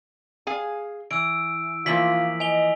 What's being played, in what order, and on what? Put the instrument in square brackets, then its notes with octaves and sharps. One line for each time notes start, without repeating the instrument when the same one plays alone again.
[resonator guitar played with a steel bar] G#4 F5 G#5
[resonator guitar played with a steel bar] E3 [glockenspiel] E6 D7
[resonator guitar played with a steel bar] E3 F3 A#3 [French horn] F4 [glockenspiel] B6 F#7
[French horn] D#5 [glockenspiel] G#5 F7 G7